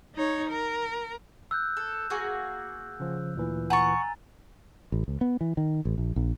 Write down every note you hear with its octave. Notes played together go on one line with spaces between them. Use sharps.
D#4 C#5
A#4
E6 F#6 G6
A4
A#3 F#4 G#4
C#3 F3
D2 A#2 E3
F#5 G#5 A#5 C#6 A6
A1
C#2
B3
E3
D#3
A1
A#1
A#1